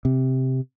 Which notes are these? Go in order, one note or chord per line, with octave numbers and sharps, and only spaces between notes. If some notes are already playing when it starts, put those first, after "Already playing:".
C3